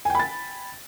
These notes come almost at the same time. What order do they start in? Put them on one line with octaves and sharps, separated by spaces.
G#5 G5 B5 A6